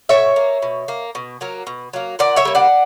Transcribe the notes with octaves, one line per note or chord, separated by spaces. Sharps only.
B2 C#5 E5
A#3
B2
A#3
B2
F#3 A#3
B2
F#3 A#3
A#2 D5 F#5
C#5 E5
G3 A#3
D5 F#5